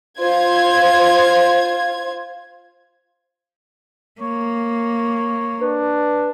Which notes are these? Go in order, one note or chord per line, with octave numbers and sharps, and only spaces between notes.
F4 C5 G#6
A#3 C#5
D4 B4